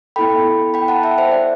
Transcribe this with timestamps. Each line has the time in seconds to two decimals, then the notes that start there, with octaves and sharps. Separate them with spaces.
0.16 B3 E4 A4 G5 B5
0.74 G5 B5
0.88 F#5 A5
1.03 E5 G5
1.18 C5 E5
1.32 D5